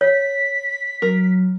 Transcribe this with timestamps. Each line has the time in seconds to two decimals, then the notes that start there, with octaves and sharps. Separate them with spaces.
0.01 C#5 B6
1.02 F#3 A#4